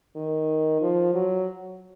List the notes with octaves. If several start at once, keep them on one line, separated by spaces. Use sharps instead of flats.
D#3
F3
F#3